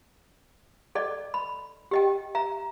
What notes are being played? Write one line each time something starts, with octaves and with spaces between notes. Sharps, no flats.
A4 D5 D#5
B5
G4 D#5 G5
E5 A#5